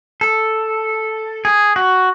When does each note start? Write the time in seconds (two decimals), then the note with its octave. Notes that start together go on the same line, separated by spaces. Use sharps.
0.21 A4
1.45 G#4
1.76 F#4